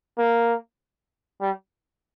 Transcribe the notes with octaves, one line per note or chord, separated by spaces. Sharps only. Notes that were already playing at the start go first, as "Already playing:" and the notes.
A#3
G3